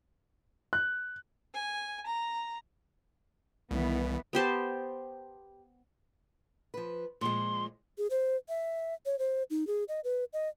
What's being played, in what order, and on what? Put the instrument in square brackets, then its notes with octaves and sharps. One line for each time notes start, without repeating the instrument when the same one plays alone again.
[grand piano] F#6
[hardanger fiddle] G#5
A#5
[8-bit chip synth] C2 [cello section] D#3 E3 B3
[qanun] B3 G4 C5 A5
[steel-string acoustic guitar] F3 B4
[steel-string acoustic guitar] A#2 F3 G#3 [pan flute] C6
[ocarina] G#4
C5
E5
C#5
C5
D#4
G#4
D#5
B4
D#5